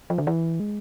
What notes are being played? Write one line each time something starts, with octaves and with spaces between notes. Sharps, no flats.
F3
D3
E3
G#3